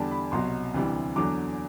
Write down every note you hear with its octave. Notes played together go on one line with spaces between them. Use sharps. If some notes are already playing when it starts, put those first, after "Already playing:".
Already playing: E2 D3 G3 A5
B5
C2 B2 F#3 C6
D2 C3 E3 G3
E2 D3 F#3 D6